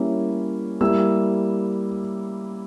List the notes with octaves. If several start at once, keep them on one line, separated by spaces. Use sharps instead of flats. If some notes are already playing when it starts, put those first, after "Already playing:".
Already playing: G3 A#3 C#4 E4
G3 A#3 E4 E6